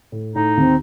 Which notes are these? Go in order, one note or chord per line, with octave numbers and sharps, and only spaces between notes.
A2
A2 D#4
D#2 C4